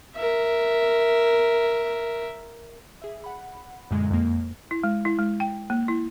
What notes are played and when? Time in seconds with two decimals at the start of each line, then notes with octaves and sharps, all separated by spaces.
0.16 A#4 E5
3.02 G#4 E5
3.24 F#5 B5
3.91 F#2 A#2 D3 G#3
4.10 F2 A#3
4.71 E4
4.83 G#3
5.05 E4
5.18 G#3
5.40 G5
5.70 A#3
5.88 E4